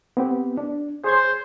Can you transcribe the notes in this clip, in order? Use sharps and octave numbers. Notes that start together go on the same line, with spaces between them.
B3 C4 G4
D4
G#4 C5 C#5 G#6